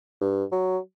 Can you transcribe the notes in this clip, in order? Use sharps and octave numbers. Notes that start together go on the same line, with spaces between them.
G2
F#3